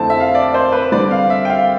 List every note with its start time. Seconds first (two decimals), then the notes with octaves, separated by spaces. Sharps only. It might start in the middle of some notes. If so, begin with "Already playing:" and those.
Already playing: F2 D3 A3 C4 E4 A5
0.10 E5
0.20 F5
0.35 D5
0.54 C5
0.72 B4
0.92 D3 G3 C4 D5
1.11 F5
1.30 E5
1.45 G5
1.50 F5